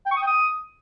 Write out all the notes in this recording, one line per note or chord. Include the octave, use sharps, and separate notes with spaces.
G5
C#6
D#6
G5
D#6